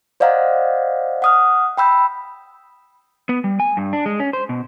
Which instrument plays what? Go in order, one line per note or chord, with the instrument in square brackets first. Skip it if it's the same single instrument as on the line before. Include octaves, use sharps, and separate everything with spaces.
[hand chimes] C5 D5 D#5 F5 F#5 A#5
F#5 D#6 F6
G5 B5 E6 G6
[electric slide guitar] B3
G3
G#5
G2
D4
G#3
C#4
C5
B2